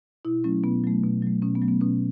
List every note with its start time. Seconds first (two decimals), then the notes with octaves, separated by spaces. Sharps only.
0.25 B2 E4
0.44 F#3 A3 C#4
0.64 B2 B3
0.84 F#3 A3
1.03 B2
1.22 F#3 A3
1.42 B2 C#4
1.55 B3
1.62 F#3 A3
1.68 B3
1.81 B2 C#4